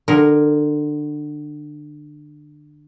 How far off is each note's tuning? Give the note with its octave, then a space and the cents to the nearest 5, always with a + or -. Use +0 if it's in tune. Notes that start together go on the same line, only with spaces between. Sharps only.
D3 +25 A#4 +0